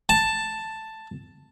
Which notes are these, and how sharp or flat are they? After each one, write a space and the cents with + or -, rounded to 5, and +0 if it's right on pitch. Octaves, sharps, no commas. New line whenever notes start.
A5 +5